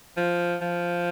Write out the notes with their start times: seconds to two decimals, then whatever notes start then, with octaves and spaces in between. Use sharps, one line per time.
0.17 F3
0.61 F3